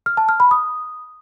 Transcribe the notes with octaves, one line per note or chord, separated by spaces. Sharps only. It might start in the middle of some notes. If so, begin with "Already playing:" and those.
F6
A5
F6
B5
D#6